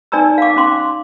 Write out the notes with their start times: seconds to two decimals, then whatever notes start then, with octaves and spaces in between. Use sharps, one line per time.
0.12 D#4 D5 G#5 A#5 E6
0.38 F5 D6
0.56 C#4 F5 C6 D6